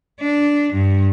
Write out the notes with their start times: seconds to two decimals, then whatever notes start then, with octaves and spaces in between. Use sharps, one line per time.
0.20 D4
0.72 G2